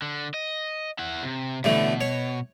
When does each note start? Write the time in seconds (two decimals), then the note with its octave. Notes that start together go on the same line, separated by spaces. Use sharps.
0.02 D3
0.34 D#5
0.99 E4 F#5
1.23 C3
1.64 A1 B2 D3 A3
2.01 C#5